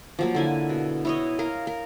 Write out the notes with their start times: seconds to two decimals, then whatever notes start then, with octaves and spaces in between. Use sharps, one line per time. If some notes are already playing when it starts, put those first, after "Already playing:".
0.19 F3 F#3 A#3
0.35 D3 E4 G#5
0.69 B2
1.05 E4 C#5 D#5
1.39 A#4 F5
1.67 A#4